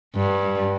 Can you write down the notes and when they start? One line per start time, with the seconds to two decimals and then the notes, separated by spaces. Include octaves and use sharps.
0.16 G2